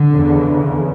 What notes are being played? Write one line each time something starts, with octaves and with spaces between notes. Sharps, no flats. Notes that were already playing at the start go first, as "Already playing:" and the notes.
Already playing: D3
E2 C#3